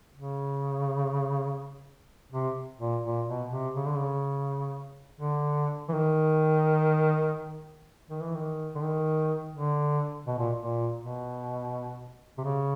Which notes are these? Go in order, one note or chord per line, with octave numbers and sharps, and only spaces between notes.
C#3
C3
A#2
A#2
B2
C3
C#3
D3
C#3
D3
E3
D#3
D#3
E3
D#3
D3
D#3
D3
B2
A#2
A#2
B2
C3
C#3